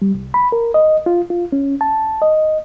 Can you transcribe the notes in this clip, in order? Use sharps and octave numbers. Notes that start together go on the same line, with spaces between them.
G3
C2
B5
A#4
D#5
F4
F4
C#4
A5
D#5